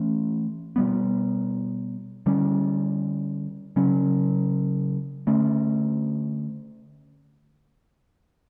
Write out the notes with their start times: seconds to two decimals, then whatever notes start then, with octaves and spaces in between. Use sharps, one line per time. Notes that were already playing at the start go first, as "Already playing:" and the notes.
Already playing: E3 A3 C#4
0.76 B2 G3 B3
2.26 D3 G3 C#4
3.76 C#3 F#3 C#4
5.27 D3 A3 C#4